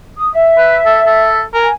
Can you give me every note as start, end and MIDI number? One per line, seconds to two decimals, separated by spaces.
0.16 0.29 87
0.33 1.41 76
0.58 0.77 71
0.85 1.00 69
1.06 1.42 69
1.54 1.68 70
1.54 1.73 80